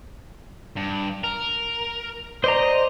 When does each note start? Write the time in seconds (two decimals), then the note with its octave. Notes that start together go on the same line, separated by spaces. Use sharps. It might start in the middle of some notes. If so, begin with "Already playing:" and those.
0.76 G2
1.24 A#4
2.44 C5 D5 D#5 A#5